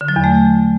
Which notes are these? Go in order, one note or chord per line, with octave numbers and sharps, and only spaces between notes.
D3
F#3
E2
A3